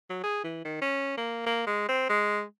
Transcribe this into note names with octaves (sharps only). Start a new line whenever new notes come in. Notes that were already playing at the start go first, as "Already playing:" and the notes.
F#3
G#4
E3
D#3
C#4
A#3
A#3
G#3
C4
G#3